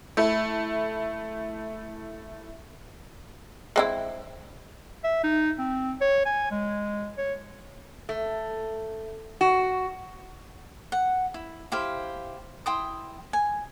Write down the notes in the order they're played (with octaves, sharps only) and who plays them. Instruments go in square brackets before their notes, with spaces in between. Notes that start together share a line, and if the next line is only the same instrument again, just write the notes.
[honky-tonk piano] A3 E4
[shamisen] G#3 C4 E4
[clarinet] E5
D#4
C4
C#5
G#5
G#3
C#5
[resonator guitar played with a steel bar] A3
F#4
[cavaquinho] F#5
E4
E4 G4 C5 F5
E4 G5 C6 D#6
G#5